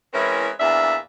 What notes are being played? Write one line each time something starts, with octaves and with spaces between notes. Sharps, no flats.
E3 G#3 C4 C#4 E4 A#4
E2 A#2 D4 E5